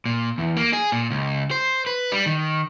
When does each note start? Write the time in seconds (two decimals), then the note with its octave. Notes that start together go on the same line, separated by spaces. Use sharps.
0.06 A#2
0.38 E2
0.57 A#3
0.73 G#4
0.92 A#2
1.11 C#2
1.51 C5
1.86 B4
2.12 G3
2.26 D#3